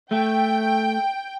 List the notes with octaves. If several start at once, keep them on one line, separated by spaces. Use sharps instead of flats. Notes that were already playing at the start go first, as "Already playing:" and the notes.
A3 G5